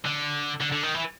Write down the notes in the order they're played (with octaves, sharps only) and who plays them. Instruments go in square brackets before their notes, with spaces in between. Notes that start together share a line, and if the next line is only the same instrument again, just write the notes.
[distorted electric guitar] D3
D3
D3
D#3
E3